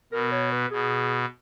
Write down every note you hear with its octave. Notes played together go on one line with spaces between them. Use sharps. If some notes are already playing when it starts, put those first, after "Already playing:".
B2 A#4
C#5
B4
B2 G#4